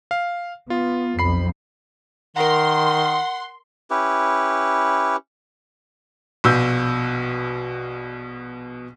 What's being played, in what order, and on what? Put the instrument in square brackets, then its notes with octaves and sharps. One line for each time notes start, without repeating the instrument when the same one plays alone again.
[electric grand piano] F5
[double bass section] B3 [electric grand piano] F4
[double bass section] B1 F2 [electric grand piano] B5 C7
[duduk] D#3 [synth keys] A#4 A#5 [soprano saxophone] F#5 [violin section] C6
[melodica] C#4 E4 G4 B4
[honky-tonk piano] A#1 B2 E6 G6